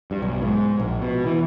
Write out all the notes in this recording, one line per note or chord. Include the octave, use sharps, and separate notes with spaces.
G2
B1
G#2
A#1
B2
E3